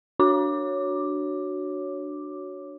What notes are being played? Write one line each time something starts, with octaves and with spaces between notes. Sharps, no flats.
D4 F#4 C#5 D6